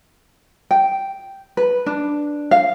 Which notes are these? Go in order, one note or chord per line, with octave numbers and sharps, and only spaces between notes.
G5
B4
D4
F5